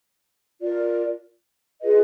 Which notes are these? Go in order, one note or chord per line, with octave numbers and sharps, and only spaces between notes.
F4 A#4 D5
F4 G#4 B4 D#5